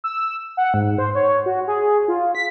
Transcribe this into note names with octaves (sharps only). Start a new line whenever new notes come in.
E6
F#5
G#2
C5
C#5
F#4
G#4
F4
B6